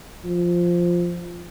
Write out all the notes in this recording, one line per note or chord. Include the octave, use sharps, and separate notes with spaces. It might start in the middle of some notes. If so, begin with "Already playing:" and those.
F3